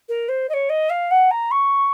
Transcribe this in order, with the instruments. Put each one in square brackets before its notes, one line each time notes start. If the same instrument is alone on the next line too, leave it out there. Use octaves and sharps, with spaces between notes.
[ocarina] A#4
C5
D#5
C#5
D#5
F5
F#5
A#5
C#6